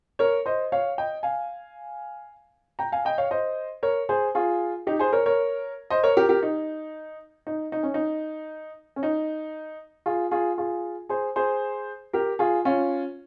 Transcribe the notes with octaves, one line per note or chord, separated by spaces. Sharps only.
A#4 C#5
C5 D#5
C#5 F5
D#5 G5
F5 G#5
G5 A#5
F5 G#5
D#5 G5
C#5 F5
C5 D#5
A#4 C#5
G#4 C5
F4 G#4
D#4 G4
G#4 C5
A#4 C#5
A#4 C#5
C5 D#5
A#4 C#5
G4 A#4
G4 A#4
D#4
D#4
D#4
C#4
D#4
C#4
D#4
F4 G#4
F4 G#4
F4 G#4
G#4 C5
G#4 C5
G4 A#4
F4 G#4
C#4 F4